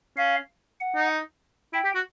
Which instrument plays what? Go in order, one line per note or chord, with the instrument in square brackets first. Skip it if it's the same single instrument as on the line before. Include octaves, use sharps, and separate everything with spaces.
[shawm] C#4 [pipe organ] F5
[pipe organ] F#5
[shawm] D#4
[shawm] E4 [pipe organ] G5
[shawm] G4
F#4